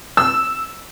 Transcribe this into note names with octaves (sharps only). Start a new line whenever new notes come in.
E6